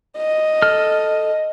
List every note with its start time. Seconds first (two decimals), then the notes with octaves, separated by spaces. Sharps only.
0.17 D#5
0.62 A4 F6